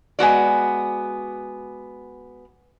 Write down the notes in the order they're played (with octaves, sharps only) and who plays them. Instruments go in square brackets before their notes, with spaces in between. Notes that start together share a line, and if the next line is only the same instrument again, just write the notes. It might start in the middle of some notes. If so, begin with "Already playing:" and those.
[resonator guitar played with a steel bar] G#3 B3 F#4 D5